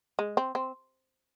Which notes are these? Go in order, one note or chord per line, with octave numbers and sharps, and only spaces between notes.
G#3
C4
C4